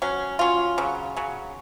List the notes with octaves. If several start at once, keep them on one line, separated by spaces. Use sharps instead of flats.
F#3 C#4
F#3 C#4 F4
C#3 F#3
C#3 F#3